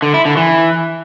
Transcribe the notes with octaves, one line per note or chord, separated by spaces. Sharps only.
D3
E4
D3
E3